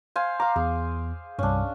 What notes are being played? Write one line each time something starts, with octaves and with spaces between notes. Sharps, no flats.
C5 F5 G#5
F5 A#5 D6
E2 G#4
C2 G2 C#4 D4